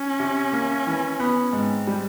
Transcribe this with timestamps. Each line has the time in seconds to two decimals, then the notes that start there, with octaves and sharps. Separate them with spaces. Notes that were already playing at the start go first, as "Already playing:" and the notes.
Already playing: C#4
0.20 C3
0.53 A#3
0.87 E3
1.20 B3
1.53 G#2 C4
1.87 G3